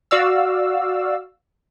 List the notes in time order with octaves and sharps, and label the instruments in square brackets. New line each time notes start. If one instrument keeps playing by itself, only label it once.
[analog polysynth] F#4 D5 F5 E6